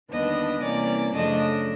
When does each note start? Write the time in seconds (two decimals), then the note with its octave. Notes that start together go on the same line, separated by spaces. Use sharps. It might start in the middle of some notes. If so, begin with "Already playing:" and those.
0.10 D#2 D3 G3 B3 D4 D#5
0.62 C3 E3 G3 A#3 C#4 D5
1.14 F#2 C#3 F3 A3 D4 D#5